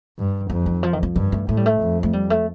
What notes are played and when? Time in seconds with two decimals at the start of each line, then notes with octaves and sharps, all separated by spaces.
0.18 G2
0.50 F2 F3
0.66 D#3
0.83 F3
0.93 D#3
1.03 F3
1.15 G2 D#3
1.32 A3
1.49 A2 A3
1.57 G3
1.66 A3
1.81 F2
2.03 A3
2.13 G3
2.30 A3